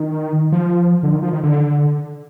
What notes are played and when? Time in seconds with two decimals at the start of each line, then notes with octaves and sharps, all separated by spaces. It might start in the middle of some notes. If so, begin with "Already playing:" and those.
Already playing: D#3
0.52 F3
1.03 D3
1.12 D#3
1.22 F3
1.33 D#3
1.43 D3